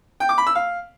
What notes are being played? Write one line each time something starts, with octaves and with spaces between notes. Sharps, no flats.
G5
D6
B5
E6
F5